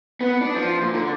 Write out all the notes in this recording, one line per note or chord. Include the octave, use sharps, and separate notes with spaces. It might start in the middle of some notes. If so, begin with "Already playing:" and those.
B3
D4
F3
A#2
D3